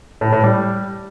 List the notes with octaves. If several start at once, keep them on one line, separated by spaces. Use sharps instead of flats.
A2
A2
G3